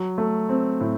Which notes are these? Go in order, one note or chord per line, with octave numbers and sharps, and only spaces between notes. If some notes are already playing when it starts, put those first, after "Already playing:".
Already playing: F#3
A3
C4
A2